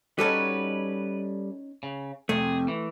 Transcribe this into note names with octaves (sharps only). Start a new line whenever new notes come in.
G3 C#4 D#4 F#4 A4 B4 C#5
C#3
F2 C3 A3 G#4
E3